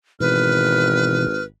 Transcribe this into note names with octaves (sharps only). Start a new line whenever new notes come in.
G#1 B2 E3 B4 F6